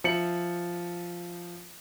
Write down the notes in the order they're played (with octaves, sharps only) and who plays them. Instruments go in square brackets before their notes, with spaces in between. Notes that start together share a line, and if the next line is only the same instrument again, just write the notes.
[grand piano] F3 E5 C#7 F#7